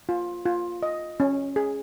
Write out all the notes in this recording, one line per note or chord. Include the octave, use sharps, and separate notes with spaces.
F4
F4
D#5
C#4
G#4